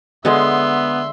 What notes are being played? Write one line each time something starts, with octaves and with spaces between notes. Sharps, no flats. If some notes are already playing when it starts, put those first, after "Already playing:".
D3 G#3 B3 E5 C6